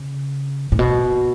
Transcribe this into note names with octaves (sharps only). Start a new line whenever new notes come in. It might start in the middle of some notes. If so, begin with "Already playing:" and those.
Already playing: C#3
A2
B2